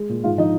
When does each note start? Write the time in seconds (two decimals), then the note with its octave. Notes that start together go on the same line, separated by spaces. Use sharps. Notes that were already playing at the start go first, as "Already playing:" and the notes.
Already playing: G#3
0.09 A#2
0.24 G#2 F4 F5
0.38 F3 D#4 D#5